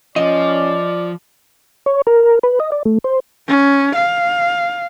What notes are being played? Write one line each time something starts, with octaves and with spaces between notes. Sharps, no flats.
F3 C#4 D5 D#5
C#5
A#4
B4
D#5
D5
A3
C5
C#4
F5